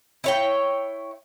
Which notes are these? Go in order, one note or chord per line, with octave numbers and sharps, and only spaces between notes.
E4 C#5 G5